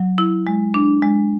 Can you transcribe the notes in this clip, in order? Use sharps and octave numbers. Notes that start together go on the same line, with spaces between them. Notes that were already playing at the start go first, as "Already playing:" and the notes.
Already playing: F#3
E4
G#3
D4
G#3